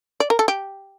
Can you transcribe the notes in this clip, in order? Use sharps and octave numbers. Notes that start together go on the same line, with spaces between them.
D5
A#4
A4
G4